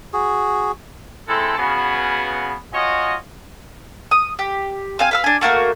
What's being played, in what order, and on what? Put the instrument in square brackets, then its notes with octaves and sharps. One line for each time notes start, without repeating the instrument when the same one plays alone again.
[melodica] F#4 G#4
[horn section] G#3 C4 E4 A4
C#3 B3 F#4
C#4 F4 F#4 C#5 D#5
[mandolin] D#6
G4
C4 F5 G#5
B4 F5 E6
D4 G#5
A3 A#3 F#4 A#4